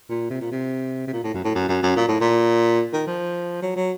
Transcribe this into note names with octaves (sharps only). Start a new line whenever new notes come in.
A#2
C3
A#2
C3
C3
A#2
A2
F#2
A2
F#2
F#2
F#2
A#2
A2
A#2
D#3
F3
F#3
F#3